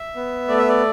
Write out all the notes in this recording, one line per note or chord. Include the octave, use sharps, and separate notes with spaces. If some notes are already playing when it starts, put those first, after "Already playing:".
Already playing: E5
B3
A3 D5
E5
D5